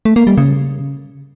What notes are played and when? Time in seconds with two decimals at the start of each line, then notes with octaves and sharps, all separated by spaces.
0.05 A3
0.16 A#3
0.27 G3
0.38 C#3